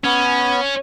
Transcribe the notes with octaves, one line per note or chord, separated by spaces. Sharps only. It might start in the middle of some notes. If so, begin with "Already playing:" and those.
B3 C#4